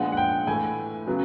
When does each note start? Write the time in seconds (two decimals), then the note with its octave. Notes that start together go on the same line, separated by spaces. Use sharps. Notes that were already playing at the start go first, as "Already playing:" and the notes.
Already playing: A#2 F3 G#3 B3 D4 F#5
0.12 F#5
0.17 G5
0.47 A2 E3 A3 G#5
1.07 C#3 F#3 B3